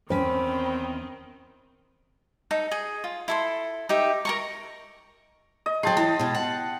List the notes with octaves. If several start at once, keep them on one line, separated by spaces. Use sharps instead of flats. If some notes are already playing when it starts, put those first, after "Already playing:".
E2 D#3 C4 C#4 C5 G5 B5
D#4 A4
G#4
F4
E4 A4 C6
D#4 G4 E5
A#4 A#5 C#6
D#5
F#3 G#4 G5 A5 C6
E3 A5
B2 G#3
F#5